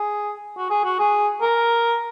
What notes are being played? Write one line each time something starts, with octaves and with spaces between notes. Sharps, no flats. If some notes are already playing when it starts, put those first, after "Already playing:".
Already playing: G#4
F#4
G#4
F#4
G#4
A#4